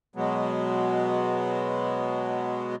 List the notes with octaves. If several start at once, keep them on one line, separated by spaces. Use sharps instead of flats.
B2 F#3 G#3 B3